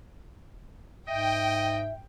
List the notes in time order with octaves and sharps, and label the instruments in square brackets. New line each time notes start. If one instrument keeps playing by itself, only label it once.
[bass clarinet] G#2 [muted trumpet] D#5 [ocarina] E5 [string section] G5